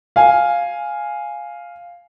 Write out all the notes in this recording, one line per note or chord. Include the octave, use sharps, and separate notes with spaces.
F5 G#5